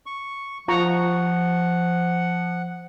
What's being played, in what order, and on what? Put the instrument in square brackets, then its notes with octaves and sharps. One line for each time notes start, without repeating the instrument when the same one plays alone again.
[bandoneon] C#6
[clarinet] F3 [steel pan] F4 A#5 C#6 [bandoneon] F#5